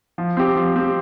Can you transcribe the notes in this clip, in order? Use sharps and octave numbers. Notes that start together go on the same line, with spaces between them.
F3
C4 G4
F3
C4 G4